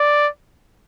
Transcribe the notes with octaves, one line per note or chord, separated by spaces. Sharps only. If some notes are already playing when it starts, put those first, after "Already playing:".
Already playing: D5